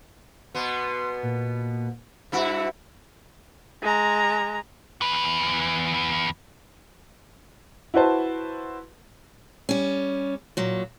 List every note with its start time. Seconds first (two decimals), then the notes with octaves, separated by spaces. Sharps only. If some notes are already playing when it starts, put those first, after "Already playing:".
0.55 B2 B3 C6
1.23 A#2
2.32 G2 E4 F#4 B5
3.82 G#3 A#5
5.02 E2 B4
7.94 E4 F#4 B4 C5 A5
9.69 G3 C#4
10.57 A#2 F#3